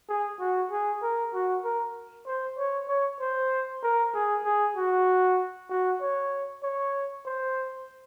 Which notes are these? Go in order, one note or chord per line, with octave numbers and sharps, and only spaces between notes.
G#4
F#4
G#4
A#4
F#4
A#4
C5
C#5
C#5
C5
A#4
G#4
G#4
F#4
F#4
C#5
C#5
C5